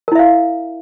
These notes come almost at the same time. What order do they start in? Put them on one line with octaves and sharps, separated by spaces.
A#4 E4 E5 F5